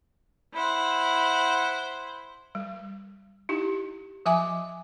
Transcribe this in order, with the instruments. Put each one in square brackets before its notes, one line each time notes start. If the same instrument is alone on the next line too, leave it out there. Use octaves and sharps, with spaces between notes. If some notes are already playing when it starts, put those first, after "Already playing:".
[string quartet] E4 C5 F#5
[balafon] G3
D#4 E4 G4
F3 E5 G#5 D6